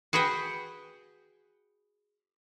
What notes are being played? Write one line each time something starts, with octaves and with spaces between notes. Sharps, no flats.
F#4 G#4 B4 F#5 G5